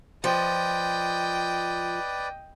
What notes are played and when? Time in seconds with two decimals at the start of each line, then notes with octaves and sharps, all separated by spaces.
0.24 F3 B4 D5 D#5 G5